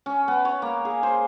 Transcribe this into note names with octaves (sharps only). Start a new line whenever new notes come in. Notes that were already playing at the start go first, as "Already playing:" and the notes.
C#4
B3
C#5
A#3
G#4
C5